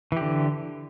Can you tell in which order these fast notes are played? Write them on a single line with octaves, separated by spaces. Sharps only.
E3 G4 D3